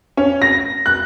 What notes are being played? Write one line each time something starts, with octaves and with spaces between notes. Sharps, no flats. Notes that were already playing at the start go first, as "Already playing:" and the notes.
C#4
A#6
F#6